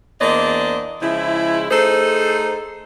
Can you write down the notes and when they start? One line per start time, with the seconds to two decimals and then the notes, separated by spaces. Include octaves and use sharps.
0.21 E2 A#3 D4 C5 D5 D#5
1.02 C#3 F3 G#3 E4
1.70 A3 D#4 G#4 A4 C5